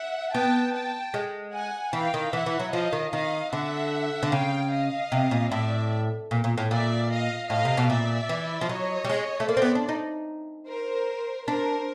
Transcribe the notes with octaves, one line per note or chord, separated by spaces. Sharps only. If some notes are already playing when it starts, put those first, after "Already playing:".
Already playing: E5 F#5
B3 G5 A5
G5 A5
G#3
F#5 G#5
E3 F5 G5
D#3
E3 E5 F#5
E3
F#3
F3 D#5 F5
D#3
D#3 D#5 F5
D3 E5 F#5
D3
C#3 F5 G5
D#5 F5
C3
A#2
A2 D5 E5
A#2
A#2
A2
A#2 D5 E5
D#5 F5
A2 D#5 F5
C3
B2
A#2 D5 E5
E3
F3
F#3 C#5 D#5
G3
G#3
A3
A#3 C5 D5
C4
B3
D4
D#4
A#4 C5
D4 A#4 C5